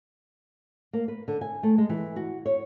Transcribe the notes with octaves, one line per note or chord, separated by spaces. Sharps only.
A#3
B4
D3
G#5
A3
G#3
E3
F#4
C#5